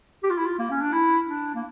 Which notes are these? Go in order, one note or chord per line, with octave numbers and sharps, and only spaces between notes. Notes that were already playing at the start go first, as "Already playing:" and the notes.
G4
F4
E4
F4
A#3
C#4
D4
E4
D4
A#3